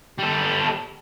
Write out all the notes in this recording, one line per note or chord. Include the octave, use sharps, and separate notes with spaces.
G3 A4